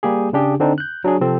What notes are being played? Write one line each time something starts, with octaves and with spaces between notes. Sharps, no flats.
G3 A#3 G4 G#4
C#3 D4 G4 G#4
D3 C4 D4 D#4
F#6 G6
F#3 D4 G#4
C3 F3 C4 A4